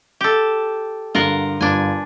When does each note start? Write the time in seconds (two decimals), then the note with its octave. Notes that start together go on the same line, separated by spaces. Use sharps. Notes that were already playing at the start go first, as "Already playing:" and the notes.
0.21 G4 A4
1.15 G2 D3 F4 A#4 F#5
1.61 G1 D4 G#5